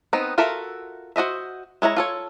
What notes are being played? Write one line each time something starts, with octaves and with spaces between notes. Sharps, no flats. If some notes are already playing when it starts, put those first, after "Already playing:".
B3 C4 D#4
F4 F#4 A4 A#4 E5
F#4 C5 D#5 E5
G#3 E4 C#5 A#5
F4 A4 C#5